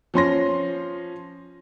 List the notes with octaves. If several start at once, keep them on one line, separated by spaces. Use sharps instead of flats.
F3 C#4 C6 A#6